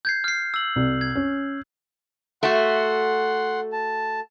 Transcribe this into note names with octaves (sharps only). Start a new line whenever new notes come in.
G6 G#6 C7
F6 C7
E6 F#7
C2
G#6
C#4
A3 F#4 F#5 C6
A5